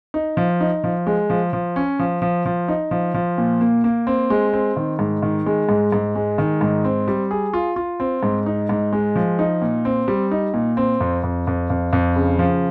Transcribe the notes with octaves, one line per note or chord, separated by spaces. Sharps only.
D#4
F3
D#4
F3
G#3
F3
F3
C#4
F3
F3
F3
D#4
F3
F3
A#2
A#3
A#3
C4
G#3
C4
D#3
G#2
D#3
G#3
G#2
G#2
G#3
D#3
G#2
C4
G3
G#4
F4
F4
C4
G#2
D#4
G#2
G#3
F3
D#4
A#2
C4
G3
D#4
A#2
C4
F2
F2
F2
F2
F2
C#3
F3